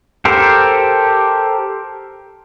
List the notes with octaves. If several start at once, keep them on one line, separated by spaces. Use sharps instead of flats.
G4 A4 A#4 C5